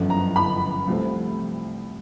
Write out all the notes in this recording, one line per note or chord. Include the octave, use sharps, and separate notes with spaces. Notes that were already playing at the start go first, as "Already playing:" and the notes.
Already playing: G1 F#2 D3 F3
A#5
B5
C2 C3 F3 A3 C4